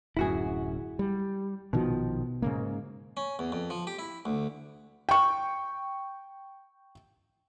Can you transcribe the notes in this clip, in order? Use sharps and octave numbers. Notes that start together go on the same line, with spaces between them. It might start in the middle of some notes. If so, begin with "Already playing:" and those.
D1 F#2 E4 F#4 G#4
G3
A#1 B2 D#3 F3
G#2 C#3 A#3
C#4
E2
F2
F3
G4
E4
D2
G5 C#6